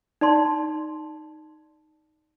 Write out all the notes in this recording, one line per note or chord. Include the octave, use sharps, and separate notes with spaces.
D#4 D5 A5 C6